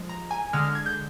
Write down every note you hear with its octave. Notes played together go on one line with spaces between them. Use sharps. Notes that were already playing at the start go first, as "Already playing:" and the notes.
Already playing: F3 G#3
A#5
G#5
D3 G#3 F6
F6
G#6
G6